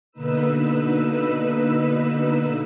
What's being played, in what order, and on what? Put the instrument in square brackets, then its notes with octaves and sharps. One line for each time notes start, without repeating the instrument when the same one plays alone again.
[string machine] B2 D3 A#3 D#4 B4 E6